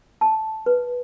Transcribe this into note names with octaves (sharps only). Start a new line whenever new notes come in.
A5
B4